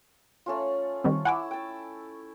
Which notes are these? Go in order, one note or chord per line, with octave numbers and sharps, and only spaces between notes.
A3 C#4 F4
D#3 G3 C4
E4 F#5 G#5 D6 E6
G5 A5